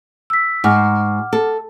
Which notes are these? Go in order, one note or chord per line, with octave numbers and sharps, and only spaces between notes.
E6 B6
G#2 F#4 F#5 D6 F6
A4